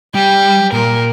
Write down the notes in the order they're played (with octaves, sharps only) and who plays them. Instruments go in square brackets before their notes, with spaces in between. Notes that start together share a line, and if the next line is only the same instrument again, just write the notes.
[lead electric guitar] G3 [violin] G4
[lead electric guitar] A#2 [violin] A#4